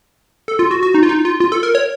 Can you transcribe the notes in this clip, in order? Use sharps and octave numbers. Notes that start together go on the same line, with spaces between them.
A4
F4
F#4
F#4
D#4
F4
D#4
F4
F4
A4
A#4
C#5